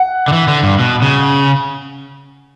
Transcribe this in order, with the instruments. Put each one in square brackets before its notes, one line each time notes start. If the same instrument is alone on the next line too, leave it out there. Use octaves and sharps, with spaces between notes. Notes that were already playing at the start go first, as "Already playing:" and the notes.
Already playing: [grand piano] F#5
[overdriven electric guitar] D3
E3
D3
G2
B2
C#3